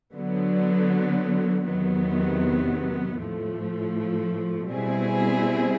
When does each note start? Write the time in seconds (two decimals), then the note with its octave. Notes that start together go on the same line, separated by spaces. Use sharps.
0.14 D3 F#3 B3
1.66 E2 C3 D#3 F#3 B3
3.18 A2 F3 A3
4.69 B2 G3 C4 E4 G#4